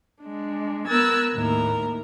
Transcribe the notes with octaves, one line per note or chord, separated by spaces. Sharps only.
G#3 D4
B3 A#4 E6 F#6 G#6 A6
D#2 A2 A#4